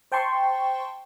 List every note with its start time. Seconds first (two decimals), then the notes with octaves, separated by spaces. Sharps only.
0.12 C5 G5 A5 C6 C#6